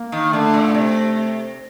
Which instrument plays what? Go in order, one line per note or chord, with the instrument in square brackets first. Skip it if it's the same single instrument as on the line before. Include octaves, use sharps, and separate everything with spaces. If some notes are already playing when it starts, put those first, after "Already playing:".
Already playing: [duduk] A#3
[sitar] D#3
[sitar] D3 [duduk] A3
[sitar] A#2
C3